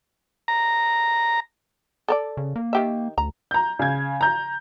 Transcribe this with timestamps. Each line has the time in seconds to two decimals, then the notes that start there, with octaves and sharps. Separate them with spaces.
0.48 A#5
2.08 A4 A#4 D5
2.37 C#3
2.56 A#3
2.73 D#3 G4 E5
3.18 D2 A#5
3.51 A#5 G6
3.79 C#3 G#6
4.21 A#5 G6